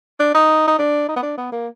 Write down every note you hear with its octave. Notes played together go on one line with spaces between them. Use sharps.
D4
D#4
D#4
D4
D#4
B3
D4
B3
A#3